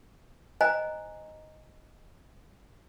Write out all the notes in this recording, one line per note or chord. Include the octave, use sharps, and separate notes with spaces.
C5 D#5 G#5 A#5